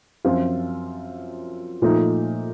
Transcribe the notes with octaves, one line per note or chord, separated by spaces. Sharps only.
F#2 F3 C4 F4
A#2 F3 A3 D#4